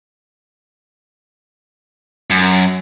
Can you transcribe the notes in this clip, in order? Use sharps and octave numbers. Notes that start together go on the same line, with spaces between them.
F#2